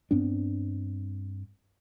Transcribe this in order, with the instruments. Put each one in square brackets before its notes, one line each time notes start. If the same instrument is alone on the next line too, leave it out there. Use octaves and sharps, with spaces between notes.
[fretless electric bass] G2 B3 C4 D4